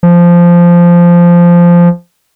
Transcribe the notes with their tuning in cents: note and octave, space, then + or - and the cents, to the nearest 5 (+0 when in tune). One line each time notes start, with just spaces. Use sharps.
F3 -10